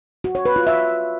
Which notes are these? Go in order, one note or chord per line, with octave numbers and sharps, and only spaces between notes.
F#4
C#5
B4
F4
E5